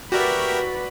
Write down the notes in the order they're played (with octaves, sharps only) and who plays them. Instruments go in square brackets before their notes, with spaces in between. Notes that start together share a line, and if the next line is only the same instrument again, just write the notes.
[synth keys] F#4 D5 [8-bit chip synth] G4 A#4 E5 [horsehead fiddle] B4 B5